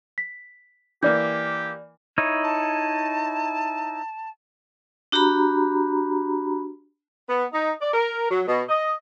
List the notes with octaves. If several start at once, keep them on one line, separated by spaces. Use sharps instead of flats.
B6
E3 A#3 G4 D5 G6
D#4 E4 C#5
A5
D4 F#4 G4 A#5 B5
B3
D#4
D5
A#4
F#3
B2
D#5